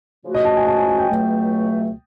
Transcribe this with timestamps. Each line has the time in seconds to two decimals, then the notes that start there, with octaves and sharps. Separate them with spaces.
0.24 C#3 F3 A3 C#4 F#4
0.34 D#5
0.45 A5
0.57 G#5
0.67 A5
0.77 G#5
0.88 G#5
0.98 G5
1.09 C#2 B2 F#3 A3